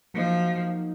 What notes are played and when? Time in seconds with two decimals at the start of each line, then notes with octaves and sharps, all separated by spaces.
0.14 F3 F#3 A#3 D#4